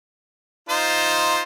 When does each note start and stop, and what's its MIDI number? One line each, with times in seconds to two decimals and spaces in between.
0.69 1.42 63
0.69 1.42 65
0.69 1.42 72